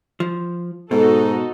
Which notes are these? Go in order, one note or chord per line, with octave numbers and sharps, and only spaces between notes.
F3
G#2 B2 D#4 F#4 A4